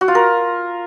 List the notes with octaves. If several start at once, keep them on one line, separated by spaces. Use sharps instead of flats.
F#4
F4
A#4